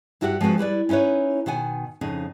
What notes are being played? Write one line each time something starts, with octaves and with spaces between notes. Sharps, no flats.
G2 E4 F#4 G4 A#4 F#5
F3 G#3 C4 F#4 B4
G3 E4 B4 D5
C#4 D#4 E4 B4 C#5
B2 D#3 F#5 G#5
F2 C#3 D#4